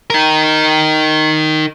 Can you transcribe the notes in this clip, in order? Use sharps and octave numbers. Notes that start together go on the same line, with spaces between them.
D#4 A#4